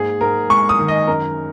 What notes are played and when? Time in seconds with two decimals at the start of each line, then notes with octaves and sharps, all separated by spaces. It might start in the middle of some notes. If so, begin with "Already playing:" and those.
Already playing: G#2 A#3 G#4
0.21 G#2 A#4
0.50 G#3 C#6
0.69 D#6
0.79 D#3
0.88 D#5
1.07 F#2 A#4